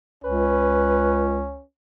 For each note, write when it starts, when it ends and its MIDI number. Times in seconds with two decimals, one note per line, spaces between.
0.24 1.58 37
0.24 1.63 61
0.24 1.43 71